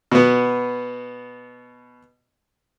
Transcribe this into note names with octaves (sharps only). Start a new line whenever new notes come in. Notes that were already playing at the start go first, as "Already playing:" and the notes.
B2 B3